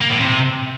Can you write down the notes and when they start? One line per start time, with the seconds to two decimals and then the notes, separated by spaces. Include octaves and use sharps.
0.01 A#3
0.10 A2
0.20 C3